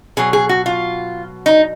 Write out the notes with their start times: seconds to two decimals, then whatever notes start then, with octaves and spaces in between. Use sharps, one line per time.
0.17 B2 F#3 G#4
0.33 G#4
0.49 F#4
0.66 F4
1.46 D#4